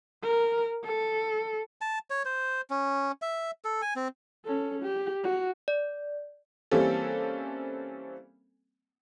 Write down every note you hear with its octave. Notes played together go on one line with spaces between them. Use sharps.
A#4
A4
A5
C#5
C5
C#4
E5
A4
G#5
C4
C#4 A4
G4
F#4
D5
E3 G3 A#3 C4 C#4 A4